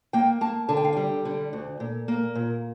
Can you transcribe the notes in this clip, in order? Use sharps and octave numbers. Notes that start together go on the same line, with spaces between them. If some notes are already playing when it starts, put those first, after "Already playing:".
A#3 G5
A#3 A5
D3 A5
G5
F5
G3 G5
D3
D2
A#2
A#3
A#2